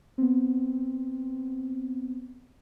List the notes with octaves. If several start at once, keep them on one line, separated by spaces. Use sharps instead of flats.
B3 C4